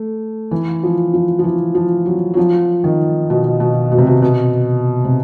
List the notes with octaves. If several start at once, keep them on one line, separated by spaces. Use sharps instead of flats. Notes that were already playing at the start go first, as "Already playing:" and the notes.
Already playing: A3
E3
F3
F3
F3
E3
F3
F#3
F#3
F3
D#3
B2
B2
B2
C3
B2
B2
C3